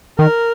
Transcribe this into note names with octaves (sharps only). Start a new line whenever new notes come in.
D#3 A#4